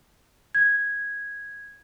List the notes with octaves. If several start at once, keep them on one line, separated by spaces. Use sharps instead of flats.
G#6